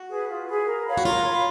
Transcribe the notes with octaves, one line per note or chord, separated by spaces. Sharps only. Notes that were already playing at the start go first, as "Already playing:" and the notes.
Already playing: F#4
G#4 B4
F4
G#4 B4
A#4
C#5 F5 B5
F#4
F4 A#4
C#5 F5 B5